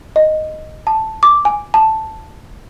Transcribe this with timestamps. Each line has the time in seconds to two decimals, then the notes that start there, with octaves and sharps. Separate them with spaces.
0.16 D#5
0.87 A5
1.23 D6
1.45 G#5
1.74 A5